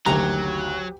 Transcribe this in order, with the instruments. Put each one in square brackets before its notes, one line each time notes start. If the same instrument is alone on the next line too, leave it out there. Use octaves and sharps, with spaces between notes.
[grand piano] F#1 D2 D#3 [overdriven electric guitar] F#3 [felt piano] G4 [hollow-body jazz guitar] A#5